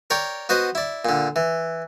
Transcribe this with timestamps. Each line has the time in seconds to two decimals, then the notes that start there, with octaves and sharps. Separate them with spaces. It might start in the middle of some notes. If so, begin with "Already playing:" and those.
0.10 A#4 C#5 D5 G5
0.49 B3 F#4 C5 D#5
0.75 E4 D5
1.05 A#2 D3
1.36 E3